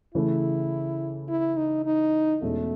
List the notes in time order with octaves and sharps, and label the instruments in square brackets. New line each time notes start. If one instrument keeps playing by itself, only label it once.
[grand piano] C#3 E3 A3 [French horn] E4
[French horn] E4
D#4
D#4
[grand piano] E2 B2 G#3 C#4 [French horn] A3